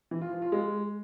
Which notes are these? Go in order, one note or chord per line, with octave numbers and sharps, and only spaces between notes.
E3
F4
F3
F4
G#3